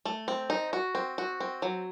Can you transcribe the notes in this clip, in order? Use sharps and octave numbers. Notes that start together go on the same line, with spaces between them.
A3
C4
D#4
F#4
C4
F#4
C4
F#3